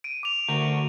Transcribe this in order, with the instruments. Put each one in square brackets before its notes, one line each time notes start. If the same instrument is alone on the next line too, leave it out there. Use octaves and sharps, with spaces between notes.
[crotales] D7 D#7
D6 F7
[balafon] D3 [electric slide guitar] A3 F#4